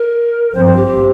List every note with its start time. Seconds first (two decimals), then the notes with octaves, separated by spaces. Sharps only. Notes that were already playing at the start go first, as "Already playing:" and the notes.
Already playing: A#4
0.55 G2 F3 C4 C5
0.66 C5
0.76 G4
0.87 G4